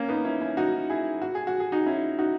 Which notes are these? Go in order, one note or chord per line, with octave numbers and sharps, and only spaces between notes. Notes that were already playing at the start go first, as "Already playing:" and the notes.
Already playing: A#3 C#4
B3 D#4
C#4 E4
C#4 E4
D#4 F#4
E4 G#4
F#4
G#4
F#4
G#4
D#4 F#4
C#4 E4
D#4 F#4